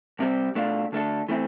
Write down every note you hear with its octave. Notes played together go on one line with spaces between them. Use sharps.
C2 C3 G3 C4
B2 A3 D4 F4
D2 D3 A3 D4 A4
E3 A3 C4 E4